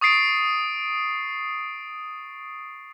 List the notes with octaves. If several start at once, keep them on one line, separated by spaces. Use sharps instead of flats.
C#6 D#6 A6 C7 D7